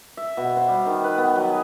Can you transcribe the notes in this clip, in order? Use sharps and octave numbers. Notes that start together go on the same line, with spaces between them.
E5
B2
C5
G3
D#3
B4
B3
F#3
G#4